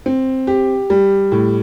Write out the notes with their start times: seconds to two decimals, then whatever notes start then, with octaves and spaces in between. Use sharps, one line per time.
0.06 C4
0.47 G4
0.90 G3
1.32 A2